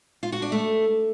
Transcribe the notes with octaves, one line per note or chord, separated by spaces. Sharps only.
F4
F#4
D4
A3